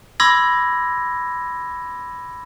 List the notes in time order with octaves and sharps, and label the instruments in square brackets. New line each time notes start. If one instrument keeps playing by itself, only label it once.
[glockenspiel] B5 C6 D6 E6 G#6 A#6